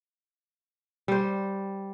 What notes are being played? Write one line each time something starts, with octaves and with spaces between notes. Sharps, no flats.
G3 C5